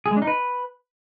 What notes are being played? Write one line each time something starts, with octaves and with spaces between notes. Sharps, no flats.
G#4
G#3
D4
D#4
B4